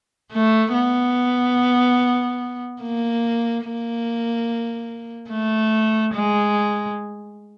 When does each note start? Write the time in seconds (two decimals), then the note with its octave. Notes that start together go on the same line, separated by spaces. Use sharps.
0.32 A3
0.73 B3
2.82 A#3
3.65 A#3
5.30 A3
6.14 G#3